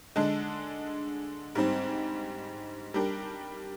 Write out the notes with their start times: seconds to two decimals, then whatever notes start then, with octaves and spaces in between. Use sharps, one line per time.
0.16 D3 G#3 D4
1.55 G#2 G3 C4
2.94 G3 D4 G4 A#4